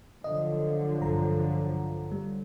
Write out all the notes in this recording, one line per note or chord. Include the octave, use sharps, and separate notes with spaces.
D3 F3 F#3 D#5
A#1 G2 A#5
G3